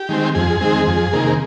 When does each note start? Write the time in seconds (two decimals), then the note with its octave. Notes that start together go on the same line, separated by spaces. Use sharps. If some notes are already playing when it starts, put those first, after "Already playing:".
Already playing: G4
0.09 D#3 G#3 C4
0.35 F2 G#4
0.61 D#3 G#3 C4
0.87 F2
1.13 C3 D#3 A#3